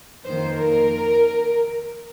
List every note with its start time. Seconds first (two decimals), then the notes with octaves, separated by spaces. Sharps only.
0.25 F2 D#3 A#3 C5
0.55 A#4